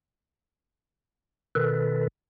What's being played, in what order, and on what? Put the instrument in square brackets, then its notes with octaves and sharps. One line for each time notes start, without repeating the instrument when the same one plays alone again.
[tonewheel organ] B2 D#3 A4 B4